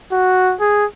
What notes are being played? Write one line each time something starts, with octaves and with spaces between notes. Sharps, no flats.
F#4
G#4